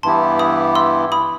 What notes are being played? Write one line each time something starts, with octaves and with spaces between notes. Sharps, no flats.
G2 E3 B3 E4 G4 A5 C6
B5 D#6
C6 E6
B5 D#6